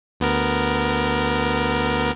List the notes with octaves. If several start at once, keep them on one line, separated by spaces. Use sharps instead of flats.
D2 B3 A#4